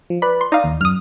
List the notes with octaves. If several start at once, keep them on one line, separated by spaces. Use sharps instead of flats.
F3
B4 D5 B5
C6
D#4 D5 F5 D#6
D#2
F#2 D#6 F6